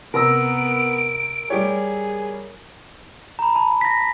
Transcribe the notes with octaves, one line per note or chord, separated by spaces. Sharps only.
C3 B3 A#4 D#6 E6 A#6 D7
G3 G4 G#4 C#5
A#5 B5
A5 B5
A#6 B6